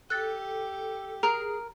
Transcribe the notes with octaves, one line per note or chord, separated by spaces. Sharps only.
G4 A4 F#6 A6
G#4 A#4 A#5